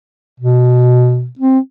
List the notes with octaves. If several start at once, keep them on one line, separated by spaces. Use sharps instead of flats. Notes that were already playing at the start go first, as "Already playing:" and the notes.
B2
C4